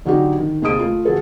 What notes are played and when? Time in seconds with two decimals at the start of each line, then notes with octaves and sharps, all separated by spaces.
0.05 D3 F#3 D#4 F#4 G4
0.39 D#3
0.62 D#2 C3 G#4 D#5 D#6 D7
0.79 A3 F4
1.05 F#3 G#4 A4